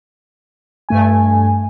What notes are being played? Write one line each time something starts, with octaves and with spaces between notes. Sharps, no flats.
G2 A3 G#5